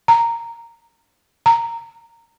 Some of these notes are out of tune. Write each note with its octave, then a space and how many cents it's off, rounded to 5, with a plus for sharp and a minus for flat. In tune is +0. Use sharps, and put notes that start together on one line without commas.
A#5 -5
A#5 -10